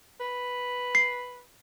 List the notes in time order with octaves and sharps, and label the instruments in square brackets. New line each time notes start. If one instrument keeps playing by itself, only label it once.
[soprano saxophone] B4
[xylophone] C7